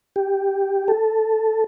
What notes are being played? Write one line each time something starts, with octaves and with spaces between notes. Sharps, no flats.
G4
A4